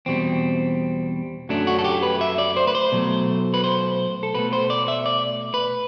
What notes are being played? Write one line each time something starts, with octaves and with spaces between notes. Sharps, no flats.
E2 B2 G3 C4
F#2 F#3 A3 D4
F#4
A4
G4
B4
E5
D5
C5
B4
C5
B2 F#3 A3
B4
C5
A4
B2 A3 B4
C5
D5
E5
D5
B4